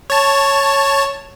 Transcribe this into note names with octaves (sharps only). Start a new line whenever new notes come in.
C#5 A5